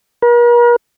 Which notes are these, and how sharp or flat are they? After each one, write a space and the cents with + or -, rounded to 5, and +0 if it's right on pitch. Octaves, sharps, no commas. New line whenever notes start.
A#4 +45